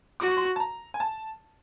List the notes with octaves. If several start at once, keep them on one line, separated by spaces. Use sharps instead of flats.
F#4 D6
C#6
C6
C#6
A5
A#5
G#5
A5